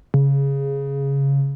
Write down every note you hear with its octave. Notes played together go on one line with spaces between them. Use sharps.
C#3